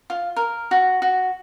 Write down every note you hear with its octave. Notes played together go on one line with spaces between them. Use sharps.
F4
A#4
F#4
F#4